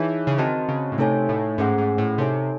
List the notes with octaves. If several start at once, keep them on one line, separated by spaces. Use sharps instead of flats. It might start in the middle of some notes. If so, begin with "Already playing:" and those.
Already playing: E3 D#4 G#4 C#5 E5
C#3
D#3 C4 F#4 C5 D#5 A5
C#3
A2
C3 A3 D#4 A4 C#5 G#5
A2
G#2 A3 C#4 G#4 C5 F#5
G#2
A2
C3 D#4 A4 C#5 G#5